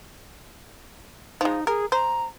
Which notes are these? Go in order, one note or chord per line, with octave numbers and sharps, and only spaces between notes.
F3 G#3 D#4
G#4 A#4
C5 A#5